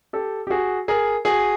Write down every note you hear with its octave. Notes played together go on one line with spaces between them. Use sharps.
G4 A4
G4
F#4 G#4
G#4 A#4
F#4 G#4